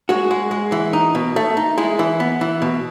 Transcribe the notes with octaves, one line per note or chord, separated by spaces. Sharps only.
G#3 F#4
G#3
G#3
E3
D#4
B2
A3
D#4
G#3 E4
E3
B3
E3
B2